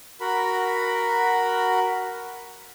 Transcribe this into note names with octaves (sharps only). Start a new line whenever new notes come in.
F#4 A#4 F#5 B5